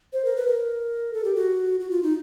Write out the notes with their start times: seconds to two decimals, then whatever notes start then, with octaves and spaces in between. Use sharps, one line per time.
0.13 C5
0.25 A#4
0.36 B4
0.47 A#4
1.14 A4
1.25 G4
1.35 F#4
1.80 F#4
1.91 F4
2.03 D#4